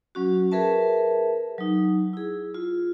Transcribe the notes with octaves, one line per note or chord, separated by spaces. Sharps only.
F#3 C#4 F#4
G#4 A#4 B4 E5 A5
F#3 D#4
E4 G#4
F4